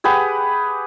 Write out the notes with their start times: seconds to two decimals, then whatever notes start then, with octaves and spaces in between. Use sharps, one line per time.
0.04 G4 G#4 B4 F#5